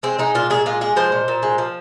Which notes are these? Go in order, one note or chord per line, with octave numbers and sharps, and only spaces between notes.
G#3 C4
G#3 D#4
A#2 F4
A#2 G#4
G#3 F4
G#3 G#4
F3 C5
A#2
A#2
G#3
F3